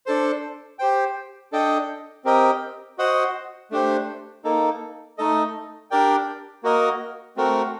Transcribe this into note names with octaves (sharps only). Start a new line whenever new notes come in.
D4 A4 C5
G4 C5 G5
D4 A4 D#5 G5
C4 G4 A#4 D#5 G5
F#4 C5 D#5 F#5
A3 D4 G4 C5
A#3 D#4 A4
A3 D#4 A4 D#5
D4 G4 A#4 D5 G5
A#3 F#4 A#4 D#5
A3 C4 F#4 A#4